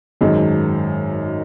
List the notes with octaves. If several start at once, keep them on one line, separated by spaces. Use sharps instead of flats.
G#1 F#2 D#3 G#3 D#4